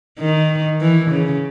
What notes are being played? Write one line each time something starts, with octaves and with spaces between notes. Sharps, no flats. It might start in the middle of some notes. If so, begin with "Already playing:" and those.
D#3
E3
C#3